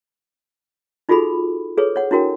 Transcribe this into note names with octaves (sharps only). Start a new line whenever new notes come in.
D#4 F4 F#4 G#4 A4 B5
G#4 A4 B4 C#5
C#5 F#5
D4 E4 F#4 A#4 G5